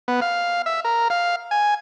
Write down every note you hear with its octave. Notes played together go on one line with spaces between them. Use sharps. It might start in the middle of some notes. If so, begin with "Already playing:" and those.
B3
F5
E5
A#4
F5
G#5